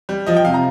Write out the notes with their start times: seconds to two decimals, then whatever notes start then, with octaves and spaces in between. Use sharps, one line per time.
0.09 G3
0.26 F3 D#5
0.37 G5
0.45 C3 F5
0.54 A#5